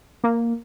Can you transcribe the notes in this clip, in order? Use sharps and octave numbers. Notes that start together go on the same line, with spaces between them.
A#3